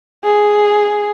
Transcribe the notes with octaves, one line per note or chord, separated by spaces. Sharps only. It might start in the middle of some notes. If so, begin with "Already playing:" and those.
G#4